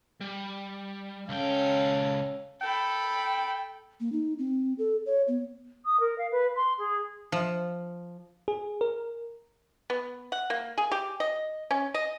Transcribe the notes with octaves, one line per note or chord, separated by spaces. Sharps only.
G3
C#2 C#4 A4 F5 G5
A4 G5 B5
A#3
D#4
C4
A4
C#5
B3
D#6
A#4
F5
B4
C6
G#4
F3
G#4
A#4
B3
F#5
A#3
G#4
G4
D#5
C#4
D#5